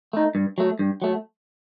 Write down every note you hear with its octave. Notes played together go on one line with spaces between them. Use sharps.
A3 D#4
G2
F#3 A3
G2
F#3 A3